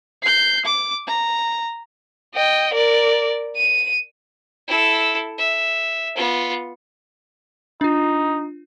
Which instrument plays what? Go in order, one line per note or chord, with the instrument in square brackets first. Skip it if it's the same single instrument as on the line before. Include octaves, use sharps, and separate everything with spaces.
[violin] G6 C7
D6
A#5
D#5 G5
A#4 D5
D#7
[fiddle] E4 A4
E5
B3 F4
[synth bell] D4 F4 [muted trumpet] D#4